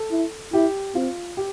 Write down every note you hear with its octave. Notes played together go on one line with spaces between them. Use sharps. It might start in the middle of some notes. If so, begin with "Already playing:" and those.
Already playing: A4
E4
E4 G4
C4 F4
G4